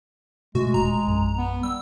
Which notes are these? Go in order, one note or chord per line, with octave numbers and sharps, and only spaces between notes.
B2 G#3 A3 F#4
E1 D#2 A#2 A#5
A#1 F#2
B3
G3 E6